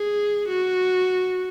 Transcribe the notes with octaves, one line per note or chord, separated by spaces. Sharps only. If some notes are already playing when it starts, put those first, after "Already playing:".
Already playing: G#4
F#4